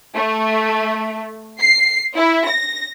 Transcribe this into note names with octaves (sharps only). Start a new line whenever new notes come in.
A3
C7
E4
A#6